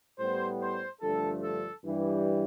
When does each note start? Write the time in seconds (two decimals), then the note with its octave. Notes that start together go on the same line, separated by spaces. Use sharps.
0.19 A2 G3 B3 C5
0.60 C5
1.01 G2 D3 F3 A3 A4
1.43 A4
1.83 G2 E3 G3